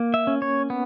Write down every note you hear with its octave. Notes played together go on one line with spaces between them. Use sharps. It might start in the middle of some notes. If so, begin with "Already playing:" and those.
Already playing: A#3
E5
C#4
C#5
B3